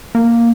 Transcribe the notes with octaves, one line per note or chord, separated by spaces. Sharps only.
A#3